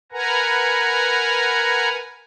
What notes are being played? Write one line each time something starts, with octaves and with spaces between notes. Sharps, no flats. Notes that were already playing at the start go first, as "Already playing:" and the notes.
A#4 B4 F#5 G#5 A#5